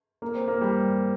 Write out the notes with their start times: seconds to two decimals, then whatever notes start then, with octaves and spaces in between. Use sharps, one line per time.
0.22 A#3
0.35 C4
0.48 A#3
0.61 G3